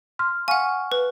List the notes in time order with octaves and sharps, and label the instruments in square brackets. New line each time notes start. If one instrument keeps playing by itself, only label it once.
[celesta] C6 F6
[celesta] F5 C#6 F6 [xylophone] F#5 G#5
[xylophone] B4